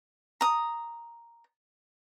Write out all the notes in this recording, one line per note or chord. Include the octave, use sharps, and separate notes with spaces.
A#5 D#6